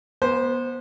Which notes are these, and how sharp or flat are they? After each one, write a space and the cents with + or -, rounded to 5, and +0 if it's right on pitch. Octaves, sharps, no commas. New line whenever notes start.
B3 -30 C5 +0